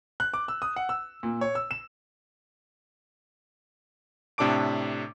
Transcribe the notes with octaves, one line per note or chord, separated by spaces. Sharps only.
F#6
D6
E6
D#6
F#5
E6
A#2
C#5
E6
E7
A2 C3 D4 A4 D6 D7